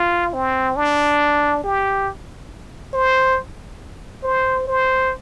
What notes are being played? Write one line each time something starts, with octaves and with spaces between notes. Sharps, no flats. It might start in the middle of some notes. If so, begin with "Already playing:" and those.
Already playing: F4
C4
D4
G4
C5
C5
C5